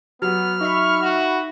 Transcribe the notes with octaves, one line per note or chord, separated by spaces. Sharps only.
F#3 B3 F6
D#4 E5 B5 C#6
F#4